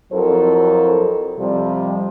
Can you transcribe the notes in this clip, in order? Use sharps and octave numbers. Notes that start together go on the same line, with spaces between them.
F2 F#3 E4 A4 A#4 C5
F2 C3 F3 G3